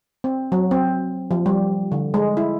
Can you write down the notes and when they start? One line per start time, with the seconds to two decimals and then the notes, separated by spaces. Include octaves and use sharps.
0.24 C4
0.52 F#3
0.71 C4
1.31 F3
1.46 G3
1.92 D3
2.14 G#3
2.37 E4